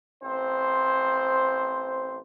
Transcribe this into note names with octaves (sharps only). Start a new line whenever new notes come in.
A1 C4 C5